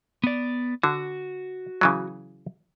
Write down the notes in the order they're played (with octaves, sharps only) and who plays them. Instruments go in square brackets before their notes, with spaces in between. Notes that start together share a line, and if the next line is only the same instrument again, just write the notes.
[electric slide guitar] B3 D5
[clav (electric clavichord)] D3 [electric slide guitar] F#4
[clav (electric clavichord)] C#3 E3 F#3